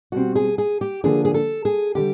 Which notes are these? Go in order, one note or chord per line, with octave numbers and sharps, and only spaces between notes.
B2 G3 C4 F#4
G#4
G#4
G4
D3 F3 A#3 D4 G#4
G#4
A4
G#4
D3 G3 G4